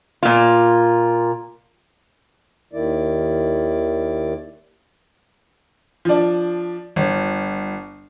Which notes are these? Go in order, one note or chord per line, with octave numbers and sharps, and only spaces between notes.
A#2 F4
D#2 D#3 E4 D5
F3 D4
G1